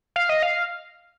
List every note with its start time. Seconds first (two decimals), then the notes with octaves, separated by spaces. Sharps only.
0.16 F5
0.29 D#5
0.42 F5